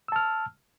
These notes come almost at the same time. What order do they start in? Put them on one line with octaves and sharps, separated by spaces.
E6 A5 F6